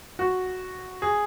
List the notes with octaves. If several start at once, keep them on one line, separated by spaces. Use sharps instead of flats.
F#4
G#4